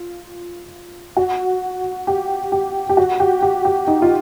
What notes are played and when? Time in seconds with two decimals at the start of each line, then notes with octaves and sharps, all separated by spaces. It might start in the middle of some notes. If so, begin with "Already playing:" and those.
Already playing: F4
1.17 F#4
2.07 G4
2.52 G4
2.89 G4
2.97 F#4
3.20 G4
3.42 G4
3.65 G4
3.88 D#4
4.02 F4